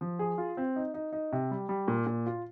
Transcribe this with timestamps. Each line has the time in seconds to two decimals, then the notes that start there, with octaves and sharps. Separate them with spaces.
0.01 F3
0.19 G#4
0.38 F4
0.57 C4
0.76 D#4
0.94 D#4
1.13 D#4
1.32 C3
1.51 G3
1.69 G3
1.88 A#2
2.07 A#2
2.26 F4